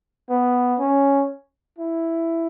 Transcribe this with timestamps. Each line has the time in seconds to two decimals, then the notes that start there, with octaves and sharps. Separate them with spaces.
0.29 B3
0.79 C#4
1.79 E4